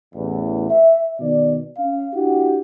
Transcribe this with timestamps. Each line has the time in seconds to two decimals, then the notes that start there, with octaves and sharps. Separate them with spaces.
0.14 A1 E2
0.70 E5
1.19 B2 D#3 D5
1.77 C#4 F5
2.14 D4 E4 F#4 G4